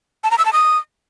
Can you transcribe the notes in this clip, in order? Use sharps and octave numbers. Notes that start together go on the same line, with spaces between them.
A5
A#5
E6
A5
D#6